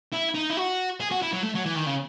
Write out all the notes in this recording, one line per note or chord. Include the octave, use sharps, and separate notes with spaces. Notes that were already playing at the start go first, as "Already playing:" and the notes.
E4
D#4
E4
F#4
G#4
F#4
E4
F#3
A3
F#3
E3
D#3
C#3